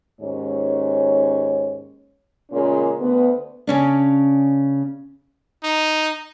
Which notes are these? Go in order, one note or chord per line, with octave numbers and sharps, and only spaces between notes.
D#2 G#2 C#4 C#5
A#2 C#3 G#3 A#3 C#4
D2 B3
C#3 C#4 D4
D#4